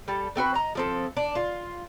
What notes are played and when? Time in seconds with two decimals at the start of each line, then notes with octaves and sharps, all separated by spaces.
0.08 G3 A4
0.36 A3 C4 F#4 B4
0.54 D#5 A#5
0.75 F3 C4 A4
1.17 D4
1.35 F4